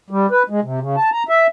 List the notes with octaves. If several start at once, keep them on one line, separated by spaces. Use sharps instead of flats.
G3
B4
G#3
C3
C#3
A5
A#5
E5